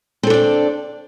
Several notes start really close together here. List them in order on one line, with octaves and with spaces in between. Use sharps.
C4 A4 D4 D5